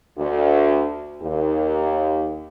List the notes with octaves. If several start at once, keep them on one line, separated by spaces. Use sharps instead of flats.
D2
D#2